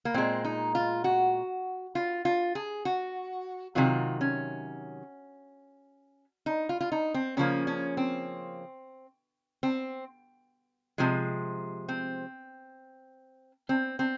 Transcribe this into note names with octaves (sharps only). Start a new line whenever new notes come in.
A#3
A#2 G#3 C4
D#4
F4
F#4
F4
F4
G#4
F#4
C3 D#3 F#3 F4
C#4
D#4
F4
F4
D#4
C4
C#3 F3 A#3 C#4
C#4
C4
C4
C3 F3 G#3
C4
C4
C4